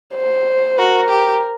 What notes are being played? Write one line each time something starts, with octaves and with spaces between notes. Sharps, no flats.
C5
F#4 A#4
G4